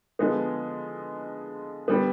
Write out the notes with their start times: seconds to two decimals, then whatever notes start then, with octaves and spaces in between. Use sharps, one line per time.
0.19 D3 F3 G#3 B3
1.88 D3 G3 B3